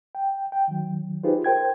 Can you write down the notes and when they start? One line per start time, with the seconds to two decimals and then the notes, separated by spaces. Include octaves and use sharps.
0.15 G5
0.52 G5
0.68 D#3 F#3
1.23 D#4 F4 G4 G#4 B4 C5
1.44 A#4 C5 G5 G#6